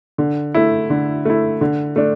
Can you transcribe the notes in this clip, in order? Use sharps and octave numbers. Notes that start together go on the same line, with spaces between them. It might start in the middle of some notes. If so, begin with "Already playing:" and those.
D3
A3 E4
D3
A3 E4
D3
A3 D4